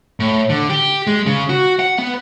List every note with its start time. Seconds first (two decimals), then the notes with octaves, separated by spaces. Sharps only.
0.20 A2
0.50 D3
0.70 G4
1.07 G#3
1.27 C#3
1.50 F#4
1.79 F#5
1.99 B3